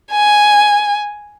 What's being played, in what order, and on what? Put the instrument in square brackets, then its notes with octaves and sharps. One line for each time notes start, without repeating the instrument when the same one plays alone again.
[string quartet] G#5